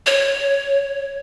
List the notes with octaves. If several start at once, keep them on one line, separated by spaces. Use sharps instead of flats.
C#5